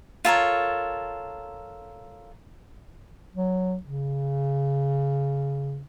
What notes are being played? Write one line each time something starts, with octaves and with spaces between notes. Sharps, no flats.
F4 A4 A#4 C#5
F#3
C#3